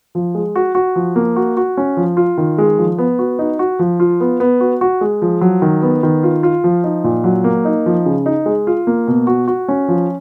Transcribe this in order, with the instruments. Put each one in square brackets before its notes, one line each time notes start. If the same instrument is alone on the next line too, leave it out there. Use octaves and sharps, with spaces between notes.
[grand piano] F3
G#3
F#4
F#4
F3
A#3
F#4
F#4
C#4
F3
F4
D#3
G#3
F3
B3
F#4
D#4
F#4
F3
F4
B3
B3
F#4
F#4
G#3
F3
F#3
D#3
B3
D#3
F4
F4
F3
D#4
A#2
F#3
A#3
D#4
F3
C#3
D#4
G#3
F4
A#3
B2
F#4
F#4
C#4
F3